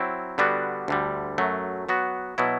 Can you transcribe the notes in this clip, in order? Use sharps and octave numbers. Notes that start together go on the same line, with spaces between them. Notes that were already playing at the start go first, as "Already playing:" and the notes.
Already playing: F#3 C4 E4
D3 G3 B3 D4 F#4
D2 D3 G3
F#2 F#3 A3
F#3 B3 F#4
B2 F#3 B3 E4